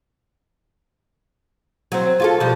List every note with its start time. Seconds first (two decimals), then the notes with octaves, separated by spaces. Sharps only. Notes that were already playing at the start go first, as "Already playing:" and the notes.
1.92 F#3 C4
2.20 F4 F#4 A4
2.40 B2 F3 G3